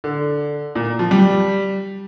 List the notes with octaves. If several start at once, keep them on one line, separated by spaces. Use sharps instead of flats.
D3
A#2
F3
G3